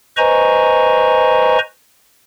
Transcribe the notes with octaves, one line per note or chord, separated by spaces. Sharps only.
B4 C5 D#5 G#5 A#5 C#6